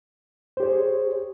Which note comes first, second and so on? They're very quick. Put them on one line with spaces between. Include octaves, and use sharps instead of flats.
C5 G4 C#5 G#4